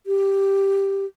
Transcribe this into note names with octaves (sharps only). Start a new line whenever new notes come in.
G4